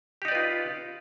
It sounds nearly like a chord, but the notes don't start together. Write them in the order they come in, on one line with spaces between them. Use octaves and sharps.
G4 D#4 D5 B4 F4